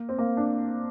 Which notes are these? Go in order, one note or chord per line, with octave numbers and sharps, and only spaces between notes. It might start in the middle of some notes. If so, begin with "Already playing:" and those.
Already playing: A#3
C4
A#3
D4